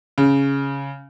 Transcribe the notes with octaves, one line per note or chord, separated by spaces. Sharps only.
C#3